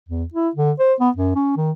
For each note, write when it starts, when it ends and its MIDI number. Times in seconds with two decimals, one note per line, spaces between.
0.08 0.24 40
0.33 0.49 64
0.55 0.71 50
0.79 0.94 72
1.00 1.10 59
1.16 1.32 42
1.35 1.54 61
1.56 1.71 51